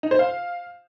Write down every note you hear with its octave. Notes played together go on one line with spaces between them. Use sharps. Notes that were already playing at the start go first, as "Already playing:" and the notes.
D#4
C5
F5